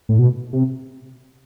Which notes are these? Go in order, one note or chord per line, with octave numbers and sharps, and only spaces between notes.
A2
B2
C3